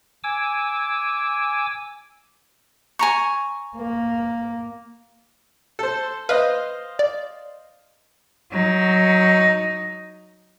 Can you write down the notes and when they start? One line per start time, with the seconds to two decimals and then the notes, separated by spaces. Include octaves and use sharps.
0.24 G#5 D6 E6
2.99 G#5 A#5 C#6
3.76 A#3
5.79 A4 C5
6.29 B4 C5 D#5 F5
6.99 D5
8.51 F#3 D#4